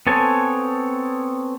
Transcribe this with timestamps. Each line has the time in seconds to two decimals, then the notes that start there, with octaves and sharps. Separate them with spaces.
0.07 B3 C4 A4 C#5 G#5